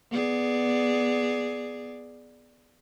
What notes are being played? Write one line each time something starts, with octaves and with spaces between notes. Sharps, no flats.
B3 G#4 D5